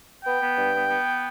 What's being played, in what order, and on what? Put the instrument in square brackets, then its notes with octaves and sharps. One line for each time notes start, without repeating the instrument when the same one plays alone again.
[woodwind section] B3 G5
B3
G2
B3
B3